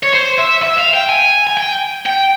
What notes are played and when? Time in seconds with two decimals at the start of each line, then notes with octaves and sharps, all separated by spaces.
0.03 C#5
0.13 C5
0.38 E5
0.62 E5
0.77 F5
0.94 G5
1.09 G#5
1.47 G#5
1.57 G5
2.06 G5